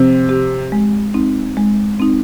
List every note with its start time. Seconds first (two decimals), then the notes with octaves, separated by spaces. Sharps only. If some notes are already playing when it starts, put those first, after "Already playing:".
Already playing: C3 F3
0.29 C4 G4
0.72 G#3
1.14 C4 D#4
1.57 G#3
2.00 C4 D#4